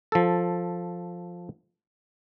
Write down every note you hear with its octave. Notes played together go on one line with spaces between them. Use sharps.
F3 A4